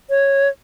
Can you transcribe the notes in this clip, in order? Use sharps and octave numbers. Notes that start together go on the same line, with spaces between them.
C#5